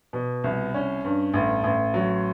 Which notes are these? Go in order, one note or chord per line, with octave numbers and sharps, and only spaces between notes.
B2
C2
C#4
G2
A1
A1
F#3